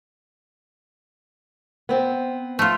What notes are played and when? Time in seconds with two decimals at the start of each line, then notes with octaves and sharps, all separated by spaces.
1.89 B3 C4
2.59 A3 F4